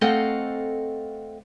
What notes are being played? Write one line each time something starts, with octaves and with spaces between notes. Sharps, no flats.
A3 C4 A4 D#5 F5 F#5